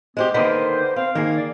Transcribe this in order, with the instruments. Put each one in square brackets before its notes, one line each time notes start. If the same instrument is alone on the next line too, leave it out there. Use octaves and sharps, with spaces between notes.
[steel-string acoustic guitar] G#3 C4 G4 [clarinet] B3
[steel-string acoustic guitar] D3 D#3 A#3 [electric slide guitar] B4 D#5 [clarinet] C5
[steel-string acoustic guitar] C4 [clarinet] F5
[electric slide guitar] D#3 G#4 [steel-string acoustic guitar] A#3
[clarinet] D5